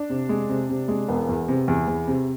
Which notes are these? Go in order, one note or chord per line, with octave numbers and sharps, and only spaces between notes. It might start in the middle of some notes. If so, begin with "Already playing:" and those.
Already playing: D4
C3
G#3
C3
C3
G#3
E1 B3
E2
C3
E2
E2
C3